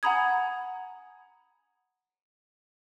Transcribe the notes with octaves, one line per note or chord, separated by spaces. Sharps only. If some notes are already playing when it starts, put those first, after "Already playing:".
F#5 G#5 A#5 B5 D#6 G#6